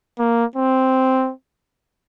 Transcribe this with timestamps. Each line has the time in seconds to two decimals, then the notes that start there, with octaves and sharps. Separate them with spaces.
0.19 A#3
0.56 C4